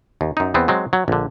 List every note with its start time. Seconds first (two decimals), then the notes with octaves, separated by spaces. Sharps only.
0.21 D#2
0.37 F#2 D#4
0.54 E2 B3 C4
0.68 F#3 G#3 C4
0.93 F#3
1.08 A#1 D3